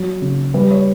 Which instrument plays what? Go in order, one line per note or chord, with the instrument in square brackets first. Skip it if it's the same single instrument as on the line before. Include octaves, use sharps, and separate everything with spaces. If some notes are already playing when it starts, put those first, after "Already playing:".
Already playing: [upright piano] F#3
C#3
G3 B4
C#5